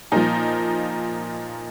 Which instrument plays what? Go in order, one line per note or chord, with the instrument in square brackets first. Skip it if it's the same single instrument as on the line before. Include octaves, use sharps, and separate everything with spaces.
[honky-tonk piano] A#2 F3 D#4